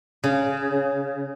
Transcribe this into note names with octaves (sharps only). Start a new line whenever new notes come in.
C#3